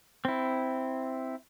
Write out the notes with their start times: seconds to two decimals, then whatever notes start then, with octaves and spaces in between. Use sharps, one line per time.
0.25 C4 E4